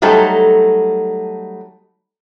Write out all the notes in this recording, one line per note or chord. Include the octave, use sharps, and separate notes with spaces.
F#3 G3 A3 D#4 A4 C5